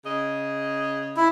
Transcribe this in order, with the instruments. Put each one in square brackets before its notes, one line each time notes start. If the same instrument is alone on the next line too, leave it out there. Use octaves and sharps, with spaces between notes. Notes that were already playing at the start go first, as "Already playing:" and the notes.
[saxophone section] C#3 D#5
[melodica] E4